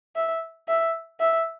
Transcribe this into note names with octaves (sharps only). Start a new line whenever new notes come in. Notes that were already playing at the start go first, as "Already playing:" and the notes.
E5
E5
E5